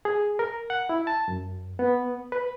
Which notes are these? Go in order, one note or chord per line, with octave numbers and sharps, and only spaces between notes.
G#4
A#4
F#5
E4
A5
F#2
B3
B4